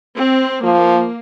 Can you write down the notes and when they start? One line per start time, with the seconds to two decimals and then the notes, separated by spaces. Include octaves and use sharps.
0.16 C4
0.63 F3 A#3